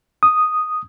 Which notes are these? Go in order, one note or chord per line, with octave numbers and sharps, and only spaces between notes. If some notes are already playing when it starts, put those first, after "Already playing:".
D#6